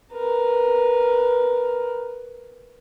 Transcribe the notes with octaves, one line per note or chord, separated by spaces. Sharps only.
A#4 B4